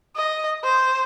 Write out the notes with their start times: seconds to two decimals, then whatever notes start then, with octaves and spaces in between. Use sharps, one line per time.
0.16 D#5
0.64 C5